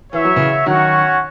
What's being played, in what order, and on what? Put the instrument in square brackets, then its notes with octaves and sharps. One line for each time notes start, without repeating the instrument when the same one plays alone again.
[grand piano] E3 [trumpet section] F#4 C#5 E5
[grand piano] F#3
C#3 E3
[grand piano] D#3 F#3 [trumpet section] C#4 F#4 C#5 F#5